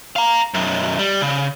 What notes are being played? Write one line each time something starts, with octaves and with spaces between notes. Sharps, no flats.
F5 A#5
B1 F#2
G3
C#3